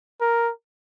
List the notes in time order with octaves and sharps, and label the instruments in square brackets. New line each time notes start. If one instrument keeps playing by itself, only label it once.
[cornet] A#4